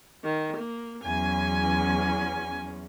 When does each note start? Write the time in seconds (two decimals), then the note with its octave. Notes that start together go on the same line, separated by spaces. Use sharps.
0.24 D#3
0.56 A#3
1.04 E2 F#3 C#4 G#5